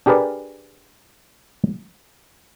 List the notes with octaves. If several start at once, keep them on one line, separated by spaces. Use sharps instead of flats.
D4 G4 G#4 A#4 B4 D5